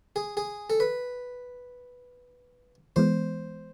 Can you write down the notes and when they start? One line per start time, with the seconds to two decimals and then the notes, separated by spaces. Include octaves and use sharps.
0.16 G#4
0.37 G#4
0.70 A4
0.80 B4
2.96 E3 G#3 B3 C5